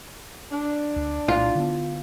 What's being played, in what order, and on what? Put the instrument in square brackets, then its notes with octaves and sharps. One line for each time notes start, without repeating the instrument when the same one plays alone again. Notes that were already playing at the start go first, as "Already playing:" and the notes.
[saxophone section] D4
[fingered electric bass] D2
[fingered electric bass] C2 A#2 [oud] F4
[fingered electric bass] D3 A3 B3